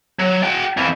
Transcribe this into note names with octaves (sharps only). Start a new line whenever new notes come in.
F#3
F#4 G5
F2 E3